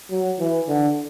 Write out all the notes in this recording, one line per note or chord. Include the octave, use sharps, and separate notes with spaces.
F#3
E3
D3